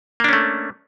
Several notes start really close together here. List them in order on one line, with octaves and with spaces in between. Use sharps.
A#3 D4 C#4 A3